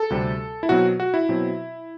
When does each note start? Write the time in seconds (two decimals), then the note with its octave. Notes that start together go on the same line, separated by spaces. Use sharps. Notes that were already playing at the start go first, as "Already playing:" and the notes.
Already playing: A4
0.10 D2 C3 G3 C4
0.63 E4
0.69 B2 F#3 C4 F#4
1.00 F#4
1.14 E4
1.29 B2 F#3 C4